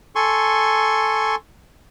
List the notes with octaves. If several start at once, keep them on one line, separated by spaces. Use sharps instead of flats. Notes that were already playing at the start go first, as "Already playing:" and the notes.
A4 G#5 C6 C#6